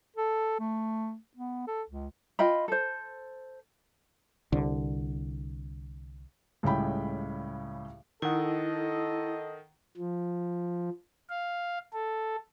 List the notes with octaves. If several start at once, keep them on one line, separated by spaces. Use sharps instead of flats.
A4
A3
B3
A4
C#2
F4 D#5 G5 B5
A4 C5
C2 D3
C#2 A2 C#3 G3 G5 B5
D#3 E4 A4 D#5 F#5
F3
F5
A4